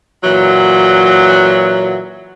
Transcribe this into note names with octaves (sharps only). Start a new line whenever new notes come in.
A#2 E3 F#3